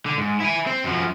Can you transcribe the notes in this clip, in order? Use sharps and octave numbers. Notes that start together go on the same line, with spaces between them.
D3
G#2
E4 G#5
C4 C5
F#2 F3